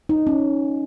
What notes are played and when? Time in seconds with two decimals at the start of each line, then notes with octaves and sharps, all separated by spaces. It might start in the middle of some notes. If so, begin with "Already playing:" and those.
0.09 D#4
0.27 C#4